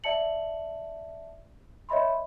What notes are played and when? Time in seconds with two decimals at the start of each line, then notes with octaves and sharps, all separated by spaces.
0.04 D5 E5 A5 C#7 F#7
1.89 C#5 D#5 E5 B5 C6